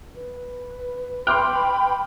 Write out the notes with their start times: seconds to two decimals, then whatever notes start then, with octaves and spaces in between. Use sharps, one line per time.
0.15 B4
1.27 G5 B5 C6 D6 F6